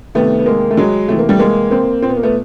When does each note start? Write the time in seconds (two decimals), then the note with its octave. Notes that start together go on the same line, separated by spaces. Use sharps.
0.15 C3 D#3 A3 B3
0.39 B3
0.46 G#3 A#3
0.71 A3
0.77 F#3 G#3
1.08 C3 E3 A3
1.19 A#3
1.29 G3 A3
1.39 G#3 A#3
1.71 A#3 C4
2.02 A#2 C4
2.09 B3
2.17 A#3
2.23 A3 B3